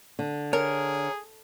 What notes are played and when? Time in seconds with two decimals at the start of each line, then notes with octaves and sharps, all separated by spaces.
0.19 D3
0.53 G#4 A#4 C#5